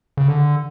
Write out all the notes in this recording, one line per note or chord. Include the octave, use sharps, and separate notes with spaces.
C#3
D3